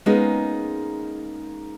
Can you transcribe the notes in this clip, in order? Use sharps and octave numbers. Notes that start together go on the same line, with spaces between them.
G#3 A#3 B3 C#4 D#4 G#4